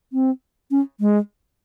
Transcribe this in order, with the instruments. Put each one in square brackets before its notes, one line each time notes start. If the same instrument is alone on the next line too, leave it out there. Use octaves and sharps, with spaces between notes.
[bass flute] C4
C#4
G#3